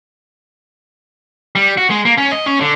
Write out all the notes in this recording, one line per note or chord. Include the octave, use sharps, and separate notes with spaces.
G3
F#4
G#3
A#3
C#4
D#5
C#4
D3